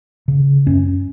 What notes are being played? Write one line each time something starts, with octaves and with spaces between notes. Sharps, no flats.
C#3
F#2 C#4